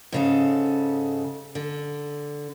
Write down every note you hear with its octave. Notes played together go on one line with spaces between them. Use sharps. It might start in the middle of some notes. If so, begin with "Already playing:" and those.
G#2 C#3 A4
D3